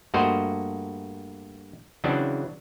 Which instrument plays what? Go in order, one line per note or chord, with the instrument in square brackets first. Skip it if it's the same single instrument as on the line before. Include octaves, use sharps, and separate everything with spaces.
[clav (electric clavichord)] G2 A3 A#3 F#4 C5 D#5
C#3 E3 F#3 C4 D4